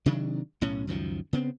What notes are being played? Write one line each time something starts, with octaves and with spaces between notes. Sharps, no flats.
C3 D#3 F#3 D4
B1 A2 C#4
C#2 F#2 D#3 F3
C#3 B3 C4